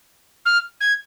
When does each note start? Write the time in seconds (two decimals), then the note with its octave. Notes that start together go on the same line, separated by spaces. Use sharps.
0.45 F6
0.80 G#6